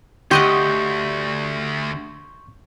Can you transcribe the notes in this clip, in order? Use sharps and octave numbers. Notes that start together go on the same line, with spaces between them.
D2 G4 D#5 F#5 C6 C#6 G6